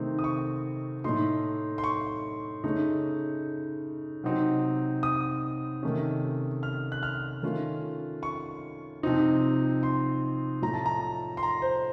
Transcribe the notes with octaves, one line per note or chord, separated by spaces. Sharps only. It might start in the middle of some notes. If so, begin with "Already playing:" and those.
Already playing: C3 D#3 A3 C4 D#4
D#6
C#6
A2 A3 D#4 C6
C6
C#6
C#3 A3 D#4
C3 F#3 C4 D#4
D#6
C3 D#3 A3 C#4
F6
F#6
F6
D#3 A3 C#4 F4
C#6
C3 F3 C4 D#4
C6
A2 F3 A3 A#5
A5
A#5
C6
A#5
C5